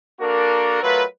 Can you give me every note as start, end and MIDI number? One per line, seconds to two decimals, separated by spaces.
0.21 0.81 58
0.21 0.81 62
0.21 0.81 66
0.21 0.81 69
0.21 0.81 70
0.83 1.03 54
0.83 1.03 57
0.83 1.03 65
0.83 1.03 70
0.83 1.03 71